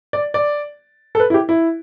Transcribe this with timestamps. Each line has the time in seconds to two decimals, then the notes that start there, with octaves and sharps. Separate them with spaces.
0.13 D5
0.34 D5
1.15 A4
1.20 B4
1.30 E4
1.34 G4
1.49 E4